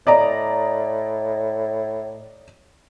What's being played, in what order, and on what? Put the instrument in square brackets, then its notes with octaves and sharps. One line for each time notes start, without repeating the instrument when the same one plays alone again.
[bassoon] A2 [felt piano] D5 D#5 A#5